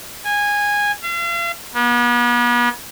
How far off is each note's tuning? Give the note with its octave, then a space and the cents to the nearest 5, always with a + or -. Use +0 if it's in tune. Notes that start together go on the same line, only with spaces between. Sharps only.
G#5 -15
F5 -40
B3 -40